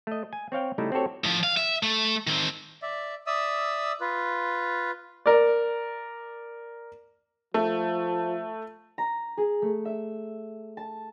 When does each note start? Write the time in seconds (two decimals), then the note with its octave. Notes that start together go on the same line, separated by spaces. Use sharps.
0.07 A3 D#5
0.33 G#5
0.52 C4 C#5 F5 G5
0.78 C#3 G3 A3 D#4 E4
0.92 C4 F#4 G4 A4 C#5
1.24 A2 F3
1.44 F5
1.57 E5
1.83 A3
2.27 D#3 C4
2.82 D5 E5
3.27 D5 E5 D#6 E6
4.01 F4 B4
5.26 A#4 D5
7.54 F3 A3
8.98 A#5
9.37 G#4
9.62 A3
9.85 E5
10.77 A5